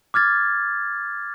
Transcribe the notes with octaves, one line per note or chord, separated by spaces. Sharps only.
D6 F6 G#6 A6